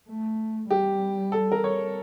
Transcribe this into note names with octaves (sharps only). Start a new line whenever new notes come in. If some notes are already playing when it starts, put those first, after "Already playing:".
A3
G3 G4
A4
A#4
C#5